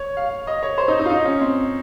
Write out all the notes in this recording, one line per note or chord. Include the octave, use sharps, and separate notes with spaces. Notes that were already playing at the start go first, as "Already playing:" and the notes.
Already playing: C#5
F5
D#5
C#5
C5
D#4
D#4
F4
D#4
C#4
C4